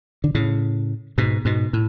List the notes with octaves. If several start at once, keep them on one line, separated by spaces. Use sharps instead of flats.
D3
A2 C#3
G#2 B2
G#2 B2
A2